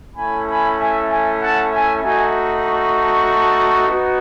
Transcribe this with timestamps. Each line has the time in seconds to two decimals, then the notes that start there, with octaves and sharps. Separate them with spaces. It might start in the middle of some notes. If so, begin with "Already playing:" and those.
0.17 A3 C#4 E4 G#5 B5
0.48 G#5 B5
0.78 E5 G#5
1.09 E5 G#5
1.40 F#5 A5
1.71 E5 G#5
2.02 A3 D#4 F#4 E5 G#5
2.64 A5 C#6
3.87 B3 D#4 F#4